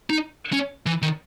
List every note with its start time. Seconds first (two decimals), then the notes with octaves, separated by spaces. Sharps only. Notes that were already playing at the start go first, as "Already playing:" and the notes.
0.10 D#4
0.52 C#4
0.86 E3
1.02 D#3